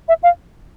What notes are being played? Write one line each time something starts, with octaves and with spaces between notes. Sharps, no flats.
E5
F5